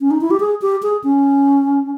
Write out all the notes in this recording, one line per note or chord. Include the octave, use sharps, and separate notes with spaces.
C#4
D#4
E4
G4
G#4
G4
G#4
C#4